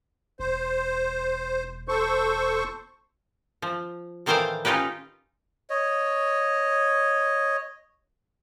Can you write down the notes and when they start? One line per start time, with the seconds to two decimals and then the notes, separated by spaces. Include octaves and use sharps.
0.40 E1 C5
1.88 A4 C5 C#6
3.62 F3
4.26 A2 D#3 E3 C5 D5 F5
4.65 C#4 D#4 F4 G4 B4
5.70 C#5 D#5